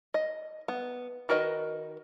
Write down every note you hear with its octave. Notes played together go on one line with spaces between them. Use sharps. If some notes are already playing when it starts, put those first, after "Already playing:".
D#5
B3
D#3 F#4 A#4 B4 D#5